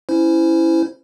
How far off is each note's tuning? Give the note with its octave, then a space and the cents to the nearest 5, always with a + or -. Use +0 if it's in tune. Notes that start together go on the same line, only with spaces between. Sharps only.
C#4 +0 E4 +0 C5 -25